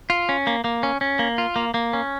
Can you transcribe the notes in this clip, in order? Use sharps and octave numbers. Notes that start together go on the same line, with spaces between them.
F4
C#4
A#3
A#3
C#4
C#4
A#3
F4
A#3
A#3
C#4